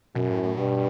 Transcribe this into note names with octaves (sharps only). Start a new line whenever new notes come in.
F#2 B2
A2
A2
G2 B2